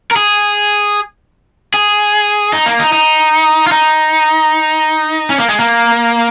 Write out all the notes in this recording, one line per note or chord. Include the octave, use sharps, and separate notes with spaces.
A#4
G#4
G#4
D#4
A#3
D#4
D#4
F4
D#4
C#4
A#3
G#3
A#3